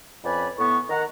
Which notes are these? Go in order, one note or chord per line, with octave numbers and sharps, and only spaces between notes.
F2 C#4 B4 D5 G#5 B5
A2 B3 C#6
D#3 F#5 A#5